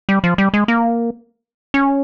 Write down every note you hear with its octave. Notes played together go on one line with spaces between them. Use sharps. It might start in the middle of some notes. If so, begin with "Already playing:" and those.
G3
F3
G3
G#3
A#3
C#4